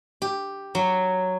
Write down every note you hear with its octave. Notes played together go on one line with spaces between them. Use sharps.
G4
F#3